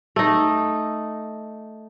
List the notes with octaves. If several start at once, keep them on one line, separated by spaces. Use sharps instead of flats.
A3 D#4